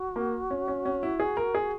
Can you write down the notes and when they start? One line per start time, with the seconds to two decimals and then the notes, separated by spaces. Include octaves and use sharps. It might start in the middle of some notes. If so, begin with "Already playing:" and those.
Already playing: F#4
0.16 A#3
0.51 C#4
0.68 C#4
0.85 C#4
1.03 E4
1.20 G#4
1.37 A#4
1.55 G#4